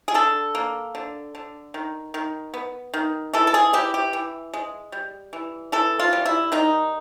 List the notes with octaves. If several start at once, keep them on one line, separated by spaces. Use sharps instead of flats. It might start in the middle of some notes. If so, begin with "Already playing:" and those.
G#4
D3 A4
A#3
D3
D3
D#3
D#3
B3
D#3
E3 A4
A4
G#4
E3 G4
G4
E3
G#3
G3
E3
E3 A4
F4
G3
E4
D#3 D#4